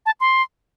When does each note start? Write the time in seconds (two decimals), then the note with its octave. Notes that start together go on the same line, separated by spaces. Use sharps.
0.06 A5
0.20 C6